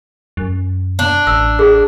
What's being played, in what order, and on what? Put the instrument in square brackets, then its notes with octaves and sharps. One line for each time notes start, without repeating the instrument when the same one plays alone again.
[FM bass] F#2
[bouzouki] D4
[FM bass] A1 [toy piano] E6
[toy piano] G#4